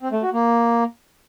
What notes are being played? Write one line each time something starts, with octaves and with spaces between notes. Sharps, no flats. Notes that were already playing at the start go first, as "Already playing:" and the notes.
C4
A3
F#4
A#3